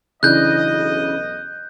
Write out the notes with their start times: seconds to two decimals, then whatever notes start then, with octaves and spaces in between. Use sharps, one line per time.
0.23 B1 C#3 E3 D4 D#5 F#6 G6